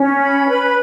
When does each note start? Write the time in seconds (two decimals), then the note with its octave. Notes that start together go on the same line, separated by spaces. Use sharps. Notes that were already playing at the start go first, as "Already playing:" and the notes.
Already playing: C#4
0.19 B5
0.47 B4